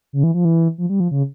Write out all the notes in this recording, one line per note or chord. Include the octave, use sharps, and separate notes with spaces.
C#3
E3
F3
E3
F3
G3
F3
C#3